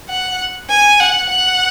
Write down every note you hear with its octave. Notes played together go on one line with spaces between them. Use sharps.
F#5
G#5
F#5
F#5